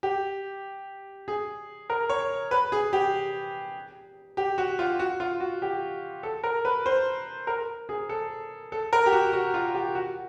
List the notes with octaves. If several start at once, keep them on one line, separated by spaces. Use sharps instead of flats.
G4
G#4
A#4
C#5
B4
G#4
G4
G4
F#4
F4
F#4
F4
F#4
G4
A4
A#4
B4
C5
A#4
G#4
A4
A4
A#4
G4
F#4
F#4
F4
G4
F#4